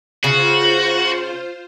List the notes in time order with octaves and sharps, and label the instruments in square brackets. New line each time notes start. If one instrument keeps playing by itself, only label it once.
[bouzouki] C#3 [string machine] F4 C5 [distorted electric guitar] F#4